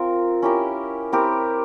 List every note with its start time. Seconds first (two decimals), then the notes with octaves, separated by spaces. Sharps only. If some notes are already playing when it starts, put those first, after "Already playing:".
Already playing: C4 F4 A#4
0.42 C#4 E4 G4 A#4
1.12 C4 E4 G4 A#4